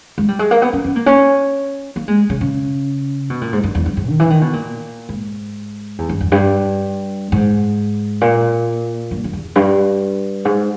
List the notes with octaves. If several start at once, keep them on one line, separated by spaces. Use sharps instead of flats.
G#3
G3
G#3
A#3
B3
C#4
C#4
A#3
C#4
A#3
G#3
C#3
C#3
B2
A#2
G#2
G2
E2
G2
G#2
D#3
E3
D#3
B2
A#2
G#2
E2
G2
E2
G2
G#2
A#2
G2
G2
E2
G2
G#2